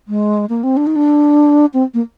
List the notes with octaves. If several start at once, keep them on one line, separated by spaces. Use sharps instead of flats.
G#3
A#3
C4
D4
D#4
D4
C4
A#3